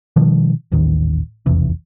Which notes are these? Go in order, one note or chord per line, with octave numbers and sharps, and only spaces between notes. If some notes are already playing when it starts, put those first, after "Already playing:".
B2 D#3 F3 G3
D#1 A1 D#2 D#3
F1 B1 E2 C3